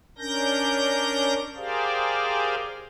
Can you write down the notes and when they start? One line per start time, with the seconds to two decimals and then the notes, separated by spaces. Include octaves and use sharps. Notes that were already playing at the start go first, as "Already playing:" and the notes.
0.18 C#4 D4 A#4 G6 A#6
1.56 G4 G#4 A#4 C5 D5 F5